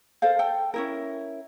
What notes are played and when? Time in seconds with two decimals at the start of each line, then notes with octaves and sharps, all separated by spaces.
0.22 A4 A#4 C5 F5
0.39 A4 G5
0.74 C#4 E4 A#4